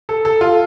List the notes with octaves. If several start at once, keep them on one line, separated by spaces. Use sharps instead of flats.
A4
A4
F4